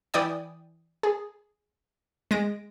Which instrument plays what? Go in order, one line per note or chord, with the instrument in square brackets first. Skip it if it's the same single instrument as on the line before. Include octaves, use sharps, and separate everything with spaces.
[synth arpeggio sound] E3 E4 D5 G5 G#5 D#6
G#4
G#3 A#6 D7